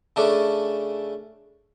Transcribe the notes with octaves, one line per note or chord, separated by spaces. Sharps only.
C#3 A3 C#4 D4